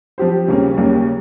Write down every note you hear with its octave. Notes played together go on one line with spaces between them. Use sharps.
F3 C4 G4 C5
D#2 C#3 G3 A#3 C#4
D#2 C#3 G3 A#3 C#4